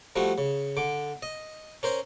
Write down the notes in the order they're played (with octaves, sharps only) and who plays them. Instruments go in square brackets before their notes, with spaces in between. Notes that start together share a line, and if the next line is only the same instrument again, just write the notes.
[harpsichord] F3 G3 A3 F#4
C#3
D3 D6
D#5
C#4 A#4 C5